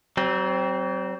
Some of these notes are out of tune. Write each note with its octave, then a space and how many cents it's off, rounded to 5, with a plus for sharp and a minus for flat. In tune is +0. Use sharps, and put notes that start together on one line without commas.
F#3 +45 C4 +0